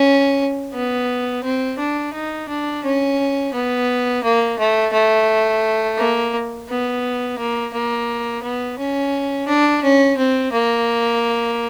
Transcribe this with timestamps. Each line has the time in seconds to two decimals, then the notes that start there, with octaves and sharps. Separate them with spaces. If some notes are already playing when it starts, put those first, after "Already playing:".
Already playing: C#4
0.74 B3
1.44 C4
1.79 D4
2.14 D#4
2.49 D4
2.84 C#4
3.54 B3
4.24 A#3
4.59 A3
4.93 A3
5.98 A#3
6.69 B3
7.38 A#3
7.73 A#3
8.43 B3
8.78 C#4
9.48 D4
9.83 C#4
10.17 C4
10.52 A#3